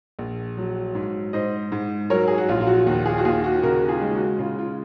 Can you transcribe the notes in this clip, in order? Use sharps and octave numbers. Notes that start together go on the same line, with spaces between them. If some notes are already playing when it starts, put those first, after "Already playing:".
A#1
F#3
G#2
G#2 C5 D#5
G#2
F#3 A#4 C#5
G#4
F#4
A#1 F4
F4
F#4
D#2 F#4
F4 G#4
F#4
D#2 F4 G#4
F#4
C#3 F#4 A#4
F4 G#4
G#3
F#4
C#3 F4
F4